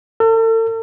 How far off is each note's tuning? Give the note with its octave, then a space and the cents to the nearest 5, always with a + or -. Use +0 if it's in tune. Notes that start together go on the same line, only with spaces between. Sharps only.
A4 +40